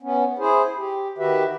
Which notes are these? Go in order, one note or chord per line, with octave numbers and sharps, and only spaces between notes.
B3 C#4
E4 G#4 C5
G4
D#3 F#4 G4 B4 E5